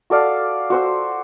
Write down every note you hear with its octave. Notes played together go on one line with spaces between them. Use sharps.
F#4 A4 D5 F5
F#4 C5 E6